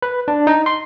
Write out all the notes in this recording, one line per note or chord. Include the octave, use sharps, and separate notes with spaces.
B4
D4
D#4
C6